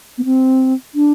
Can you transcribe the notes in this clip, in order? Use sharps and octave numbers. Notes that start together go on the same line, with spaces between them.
B3
C4
D4